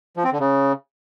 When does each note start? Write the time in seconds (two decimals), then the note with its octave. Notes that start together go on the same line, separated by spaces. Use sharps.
0.17 F3
0.24 C4
0.32 D3
0.40 C#3